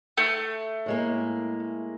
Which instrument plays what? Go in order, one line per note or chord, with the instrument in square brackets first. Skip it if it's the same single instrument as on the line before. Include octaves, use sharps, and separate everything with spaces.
[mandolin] A3
[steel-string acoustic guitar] A2 G#3 A#3